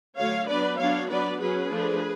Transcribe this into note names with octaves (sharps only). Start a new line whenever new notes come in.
D3 F#3 A3 C#5 F5
F#3 B3 D4 B4 D5
F#3 B3 D4 C#5 F5
F#3 B3 D4 B4 D5
F#3 C#4 G#4 B4
F3 A3 D4